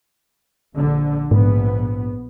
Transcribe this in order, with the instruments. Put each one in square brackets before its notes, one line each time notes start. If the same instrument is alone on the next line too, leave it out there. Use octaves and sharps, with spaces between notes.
[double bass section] A#1 D3
[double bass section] A#1 B3 [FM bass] G#2